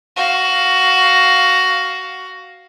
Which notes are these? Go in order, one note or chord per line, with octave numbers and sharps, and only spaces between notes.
F#4 F5